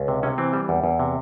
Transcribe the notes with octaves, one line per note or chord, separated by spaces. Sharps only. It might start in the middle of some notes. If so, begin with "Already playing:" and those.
Already playing: C#2
C3
C3 C#4
E3 C4
G3
E2
E2
C3